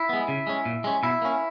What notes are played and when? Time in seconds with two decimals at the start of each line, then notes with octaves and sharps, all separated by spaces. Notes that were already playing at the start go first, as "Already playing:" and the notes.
Already playing: E4
0.09 G#3 B3
0.28 C#3
0.47 G#3 C#4
0.65 A#2
0.84 G#3 C#4
1.03 B2 E4
1.22 A#3 C#4